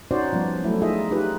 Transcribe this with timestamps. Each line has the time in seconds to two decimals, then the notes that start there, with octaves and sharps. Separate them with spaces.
0.11 C#4 D#4 F#4 C5 D5
0.33 F3 G3 B3
0.64 F#3 A3 E4
0.81 D#4 F4 G#4 D#5 E5
1.11 D#4 F4 G4 B4